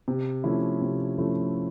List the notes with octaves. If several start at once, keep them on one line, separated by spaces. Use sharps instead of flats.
C3
F3 A3 C#4 E4
C3
F3 A3 C#4 E4